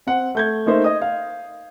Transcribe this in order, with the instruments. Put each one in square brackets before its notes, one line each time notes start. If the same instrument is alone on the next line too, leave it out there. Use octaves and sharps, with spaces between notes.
[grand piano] C4 F#5
A3 G6 G#6
A3 A#3 D#4 C5 E5
D#5 D#6
F5